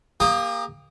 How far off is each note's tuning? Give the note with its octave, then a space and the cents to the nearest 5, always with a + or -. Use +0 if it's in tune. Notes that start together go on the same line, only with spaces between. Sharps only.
A#3 +0 G4 +30 D#6 +0